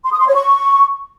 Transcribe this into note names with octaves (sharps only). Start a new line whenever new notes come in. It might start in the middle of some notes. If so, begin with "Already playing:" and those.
C6
D#6
C6
C#5
C#6